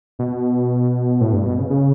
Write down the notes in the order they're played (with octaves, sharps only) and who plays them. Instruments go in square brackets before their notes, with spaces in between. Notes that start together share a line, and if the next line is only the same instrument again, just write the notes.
[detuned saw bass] B2
A2
G2
B2
C#3
C#3